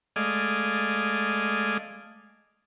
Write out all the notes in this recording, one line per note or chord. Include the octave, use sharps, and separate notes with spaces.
G#3 A3 D5 D#5 F5 G#5